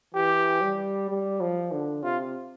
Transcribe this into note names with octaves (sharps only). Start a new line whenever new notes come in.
E3 G4
G3
G3
F3
D3
C3 F4